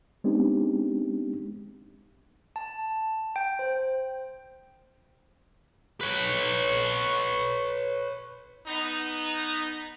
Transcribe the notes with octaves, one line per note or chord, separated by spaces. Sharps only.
G#3 B3 C4 D4 D#4 G4
A5
G5
C5
B4 C#5
B3 D#4